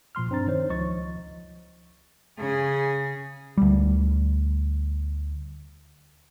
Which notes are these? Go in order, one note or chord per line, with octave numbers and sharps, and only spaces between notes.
A#2 F3 C6 F6
G2 C4 D4 A#5 A6
D#3 D#4 C5 C#5
C#2 F3 D#5 C#6 A6
C#3 G#4
D2 G3